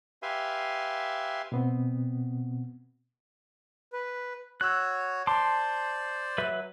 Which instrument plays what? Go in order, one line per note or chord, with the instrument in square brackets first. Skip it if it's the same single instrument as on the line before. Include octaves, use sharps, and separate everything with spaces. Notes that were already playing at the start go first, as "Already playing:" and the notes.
[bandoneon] G4 B4 E5 F5 G#5 C6
[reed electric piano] B2 B3 C4
[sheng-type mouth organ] B4
[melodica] F#4 C#5 [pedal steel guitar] E6 F#6
[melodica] C5 D5 [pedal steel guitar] A5 C6 D6
[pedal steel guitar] F#3 B4 E5